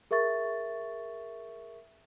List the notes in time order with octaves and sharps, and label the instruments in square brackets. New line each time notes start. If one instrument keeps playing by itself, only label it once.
[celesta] G#4 A#4 E5 C#6 A6